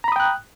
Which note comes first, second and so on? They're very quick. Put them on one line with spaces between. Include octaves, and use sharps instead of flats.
A#5 B5 D#6 G5 F#6